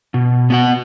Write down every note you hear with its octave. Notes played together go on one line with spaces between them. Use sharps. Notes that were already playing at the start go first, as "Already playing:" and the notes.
B2
B3 F#4 F#5